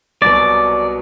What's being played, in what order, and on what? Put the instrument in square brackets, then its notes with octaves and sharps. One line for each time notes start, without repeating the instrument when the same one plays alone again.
[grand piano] C2 B2 F#3 B3 [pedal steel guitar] D5